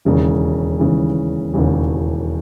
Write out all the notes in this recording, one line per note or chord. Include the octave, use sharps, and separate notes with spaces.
E1 D#2 C#3 E3
E1 D#2 C#3 E3
E1 D#2 C#3 E3